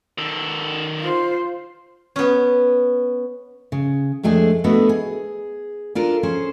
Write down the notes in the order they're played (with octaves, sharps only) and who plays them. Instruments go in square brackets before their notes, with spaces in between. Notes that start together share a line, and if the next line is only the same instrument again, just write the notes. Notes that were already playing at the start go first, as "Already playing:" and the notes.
[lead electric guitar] D#3 A4
[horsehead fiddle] F4 C5
[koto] B3 C#4
[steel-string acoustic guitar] C#3
F2 G#3 A3 D4 G#4
A3 B3 D4 F#4 A4 D#5
G#4
D4 F4 A4 A#4
C#4 G#4 C5